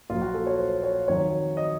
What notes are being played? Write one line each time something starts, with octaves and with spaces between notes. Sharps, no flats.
A#1 A#2 F#3 F4
F#4
A4
C#5
C5
C#5
F2 D#3 F#3 C#5
D#5